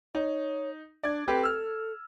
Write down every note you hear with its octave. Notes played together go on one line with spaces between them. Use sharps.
D#4 C#5
D4 D5 G#6
C4 G4 A4 B4
E6 F6